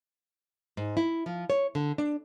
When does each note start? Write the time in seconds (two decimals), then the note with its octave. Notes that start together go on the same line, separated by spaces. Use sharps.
0.77 G#2
0.97 E4
1.26 F3
1.50 C#5
1.75 D3
1.98 D4